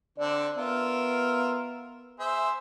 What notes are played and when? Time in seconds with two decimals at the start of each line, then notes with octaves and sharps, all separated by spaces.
0.18 D3 C4 D4 D5
0.57 B3 F4 A#4 E5
2.20 G#4 C5 E5